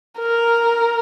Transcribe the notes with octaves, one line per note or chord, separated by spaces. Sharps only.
A#4